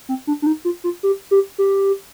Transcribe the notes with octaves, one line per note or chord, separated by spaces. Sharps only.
C4
D4
D4
D#4
F4
F4
G4
G4
G4